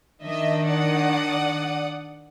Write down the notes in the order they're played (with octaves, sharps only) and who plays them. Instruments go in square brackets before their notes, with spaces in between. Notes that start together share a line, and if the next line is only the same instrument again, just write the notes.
[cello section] D#3 D4 [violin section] D#5 E5
[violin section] D5 F#5 D#6